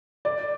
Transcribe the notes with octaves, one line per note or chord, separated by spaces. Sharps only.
D5